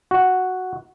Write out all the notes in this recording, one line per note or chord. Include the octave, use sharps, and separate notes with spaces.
F#4